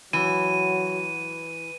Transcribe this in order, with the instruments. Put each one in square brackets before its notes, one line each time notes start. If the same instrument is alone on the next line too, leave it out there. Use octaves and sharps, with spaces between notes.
[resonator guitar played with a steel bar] E3 [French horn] F#3 [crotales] D#7